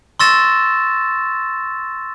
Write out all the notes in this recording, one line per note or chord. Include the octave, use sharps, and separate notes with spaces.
C6 C#6 E6 A6 A#6 E7